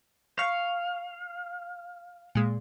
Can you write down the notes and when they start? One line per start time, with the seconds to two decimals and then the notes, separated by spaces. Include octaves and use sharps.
0.39 F5 C#6
2.35 A#2 G#3